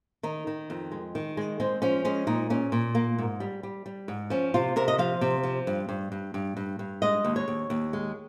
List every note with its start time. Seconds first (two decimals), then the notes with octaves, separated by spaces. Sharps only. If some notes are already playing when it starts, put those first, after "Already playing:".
0.23 D#3 D#4
0.47 D#3
0.70 F2
0.92 G#3
1.15 D#3
1.37 G#3
1.60 G#3 C4
1.82 F3 C#4
2.05 G#3 C#4
2.27 A#2 D#4
2.50 A#2 C#4
2.72 A#2
2.95 A#3
3.18 G#2
3.40 G3
3.63 G3
3.86 G3
4.08 G#2
4.30 F3 C#4
4.54 C3 F4
4.76 C3 A#4
4.88 D#5
4.98 F3 F5
5.21 C3
5.43 F3
5.67 G2
5.89 G2
6.12 G2
6.34 G2
6.57 G2
6.79 G2
7.02 G#3 D#5
7.24 D#2
7.36 C#5
7.48 D#2
7.70 D#2
7.93 G#3